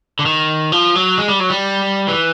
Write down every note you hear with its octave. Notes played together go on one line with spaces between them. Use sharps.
D3
D#3
F3
F#3
G#3
G3
F#3
G3
E3